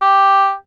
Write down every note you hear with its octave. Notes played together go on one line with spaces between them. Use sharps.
G4